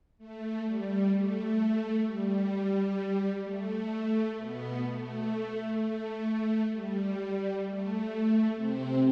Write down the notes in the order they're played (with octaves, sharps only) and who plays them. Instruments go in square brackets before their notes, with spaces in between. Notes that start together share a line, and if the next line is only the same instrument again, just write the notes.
[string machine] A3
G3
A3
G3
A3
B2 B3
A3
A3
G3
A3
C3 C4